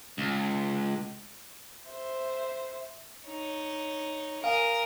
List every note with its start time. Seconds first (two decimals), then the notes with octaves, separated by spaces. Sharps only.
0.18 C#2
1.88 C5 E5
3.27 D#4 C#5
4.44 A#4 F5 G#5 D#6